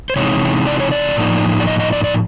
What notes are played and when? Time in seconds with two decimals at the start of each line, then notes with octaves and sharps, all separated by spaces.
0.10 C5
0.16 C3 E3 G#3 C4 D#4 C#5
0.67 D5
0.80 C#5
0.92 D5
1.16 A2 F3 A#3 D#4
1.60 D5
1.67 D#5
1.80 D#5
1.93 D5
2.04 D5